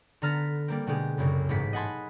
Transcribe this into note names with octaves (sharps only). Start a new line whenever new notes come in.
D3 B3 A#5 F6 A6 B6
G3 A#3 C4
B2 D3 G#3 G4 G#4
C2 F#2 C#3
A1 G#2 B3 B6
D#5 F#5 G#5 A5 B5 C6